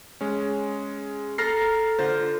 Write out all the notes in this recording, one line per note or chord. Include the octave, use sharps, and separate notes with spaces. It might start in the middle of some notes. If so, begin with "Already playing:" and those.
G#3 C#4
A4 A#5 F6 A#6 C7
D3 F4 C5